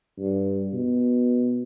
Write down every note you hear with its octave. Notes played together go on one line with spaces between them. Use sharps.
G2
B2